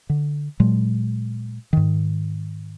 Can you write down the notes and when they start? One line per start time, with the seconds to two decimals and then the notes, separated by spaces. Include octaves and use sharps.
0.10 D3
0.60 A#2 F#3 G#3
1.73 G#2 D#3